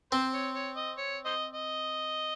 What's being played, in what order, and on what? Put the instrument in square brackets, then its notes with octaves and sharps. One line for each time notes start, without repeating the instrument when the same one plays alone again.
[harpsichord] C4 [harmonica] C5
[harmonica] C#5
C#5
D#5
C#5
C5 D#5
D#5